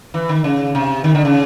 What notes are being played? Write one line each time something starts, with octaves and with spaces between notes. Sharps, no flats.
E3
D#3
C#3
C3
D#3
D3
C#3